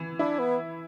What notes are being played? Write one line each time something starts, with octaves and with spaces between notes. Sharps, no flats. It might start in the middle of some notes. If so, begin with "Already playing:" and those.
Already playing: E3
D4 E4
B3